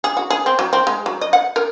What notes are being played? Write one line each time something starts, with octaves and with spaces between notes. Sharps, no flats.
G#4
F#4
G#4
C4
F#3
C4
G#3
F#3
D#5
F#5
A#4